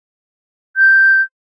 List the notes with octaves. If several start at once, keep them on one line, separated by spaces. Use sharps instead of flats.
G6